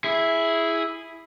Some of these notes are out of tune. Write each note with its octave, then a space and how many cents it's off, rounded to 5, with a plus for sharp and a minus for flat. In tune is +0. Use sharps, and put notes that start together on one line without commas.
E4 +0 G#4 +0